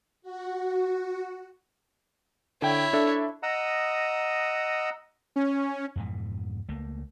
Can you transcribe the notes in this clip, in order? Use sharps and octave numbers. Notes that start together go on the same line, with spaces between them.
F#4
D3 E4 C#5 G5
D4 A4 E5
D#5 F#5 A#5 D#6 E6
C#4
F2 G#2 B2 E3
C#2 A3 A#3